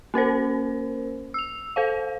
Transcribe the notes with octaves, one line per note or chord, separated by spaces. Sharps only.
A#3 C#4 A#4 C5
E6 F7
A4 C5 F5